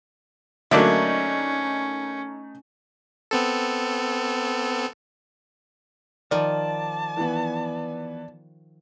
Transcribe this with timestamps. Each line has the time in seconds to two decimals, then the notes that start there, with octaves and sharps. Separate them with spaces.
0.71 D3 F#3 A3 A#3 C#4 D#4 D5 E5
3.31 B3 C4 A4
6.31 D#3 F3 D5 A5
7.17 E3 B3